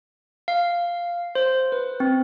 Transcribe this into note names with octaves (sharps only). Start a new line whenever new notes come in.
F5
C5
B4
C4